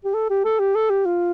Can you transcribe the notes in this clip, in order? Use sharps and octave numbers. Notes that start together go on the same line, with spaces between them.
G4
A4
G4
A4
G4
A4
G4
F4